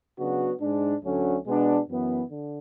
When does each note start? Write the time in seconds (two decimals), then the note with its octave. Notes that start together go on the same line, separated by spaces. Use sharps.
0.18 C#3 F#3 B3 D4 F#4
0.61 G#2 G#3 D4
1.04 D2 D3 F#3 A3 C#4
1.46 B2 G#3 B3 D4
1.89 F#2 E3 B3
2.30 D3